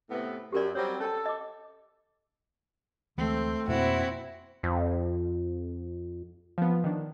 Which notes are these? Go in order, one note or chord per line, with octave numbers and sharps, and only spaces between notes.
A2 C3 B3
F#2 G4 A#4 D5
F#3 G3 C4 C#5
C#4 A4 A5
D#5 D6
D2 E3 G#3 A3 C4
F2 B2 A#3 C4 E4 F#4
F2
F3 B3
D#3 D4